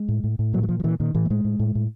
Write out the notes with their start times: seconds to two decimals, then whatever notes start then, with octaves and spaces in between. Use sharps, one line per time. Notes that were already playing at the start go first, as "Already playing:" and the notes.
Already playing: G#3
0.08 A2
0.24 A2
0.39 A2
0.53 A#2 F#3
0.63 F#3
0.69 A#2 F3
0.80 F3
0.84 A#2 E3
1.00 A#2 D#3
1.15 A2 E3
1.26 A3
1.30 A2 G#3
1.45 A2
1.60 A2
1.75 A2